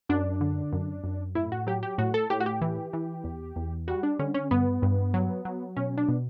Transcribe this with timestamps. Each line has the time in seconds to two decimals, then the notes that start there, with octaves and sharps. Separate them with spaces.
0.09 F#2 D4
0.41 D3
0.73 F#2
1.04 F#2
1.35 A2 E4
1.52 F#4
1.67 F#3 G4
1.83 G4
1.98 A2 F#4
2.14 A4
2.30 A2 G4
2.40 F#4
2.46 G4
2.61 E3
2.93 E3
3.24 E2
3.56 E2
3.88 G3 F#4
4.03 D4
4.19 D3 C#4
4.34 C#4
4.51 G2 B3
4.82 G2
5.14 F#3
5.45 F#3
5.76 B2 C#4
5.98 D4
6.08 B2